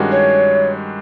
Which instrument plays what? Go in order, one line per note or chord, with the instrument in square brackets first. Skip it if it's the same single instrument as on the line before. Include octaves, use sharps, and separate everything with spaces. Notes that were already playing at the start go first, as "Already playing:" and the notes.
Already playing: [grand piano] G2 D#3 G#3 C#4 F#4
[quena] C#5